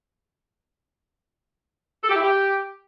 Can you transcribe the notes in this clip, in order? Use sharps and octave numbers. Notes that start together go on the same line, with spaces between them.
A4
G4
E4
G4